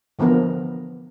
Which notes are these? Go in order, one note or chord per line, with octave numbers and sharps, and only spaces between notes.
D3 E3 F3 B3 A#4